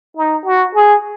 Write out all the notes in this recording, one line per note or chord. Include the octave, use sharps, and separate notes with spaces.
D#4
F#4
G#4